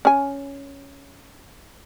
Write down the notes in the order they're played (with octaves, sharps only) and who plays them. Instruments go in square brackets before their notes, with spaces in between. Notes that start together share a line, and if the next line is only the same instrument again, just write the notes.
[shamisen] C#4 G#5